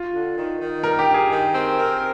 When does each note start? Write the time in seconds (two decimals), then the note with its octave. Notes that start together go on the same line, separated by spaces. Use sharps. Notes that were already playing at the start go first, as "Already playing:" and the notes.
Already playing: F4
0.13 D3
0.37 D#3
0.60 D#3
0.83 G3 A#4
0.99 G4
1.06 G2
1.14 G#4
1.29 D#3
1.53 C4
1.77 A#4